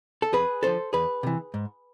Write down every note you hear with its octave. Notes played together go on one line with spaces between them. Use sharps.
A4
F2 G#4 B4
D3 F3 A4 C5
E2 G#4 B4
C3 E3
G#2